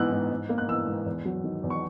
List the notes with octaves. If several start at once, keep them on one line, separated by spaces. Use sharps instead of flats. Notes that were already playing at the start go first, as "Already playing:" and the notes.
Already playing: G#2 E3 B3 E6 F#6
G#2
G#2
A#3
F#6
E3 E6
G#2
E2
F#3
D#3
E2
C#6